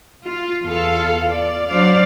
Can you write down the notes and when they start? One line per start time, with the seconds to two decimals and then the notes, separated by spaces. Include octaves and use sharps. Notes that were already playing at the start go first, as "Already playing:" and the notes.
0.24 F4
0.64 E2 F4 A4 F5
1.30 D5
1.68 F#3 D4 C5 D5 F5